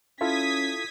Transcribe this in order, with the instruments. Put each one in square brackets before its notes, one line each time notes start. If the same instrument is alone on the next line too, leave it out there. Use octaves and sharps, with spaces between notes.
[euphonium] C#4 [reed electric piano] E4 F4 A4 [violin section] D#6 G#6 B6